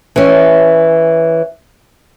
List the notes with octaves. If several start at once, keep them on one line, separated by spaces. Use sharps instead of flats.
E3 C#4